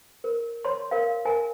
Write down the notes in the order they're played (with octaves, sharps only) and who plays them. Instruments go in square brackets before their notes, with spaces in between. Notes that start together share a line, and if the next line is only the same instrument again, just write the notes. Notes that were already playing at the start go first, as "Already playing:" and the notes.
[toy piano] A#4
C#5 C6
A#4 F5
A#4 G#5